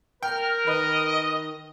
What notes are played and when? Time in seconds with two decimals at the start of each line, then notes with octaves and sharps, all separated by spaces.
0.23 A#4 G5 F6
0.67 D#3 B4 D#5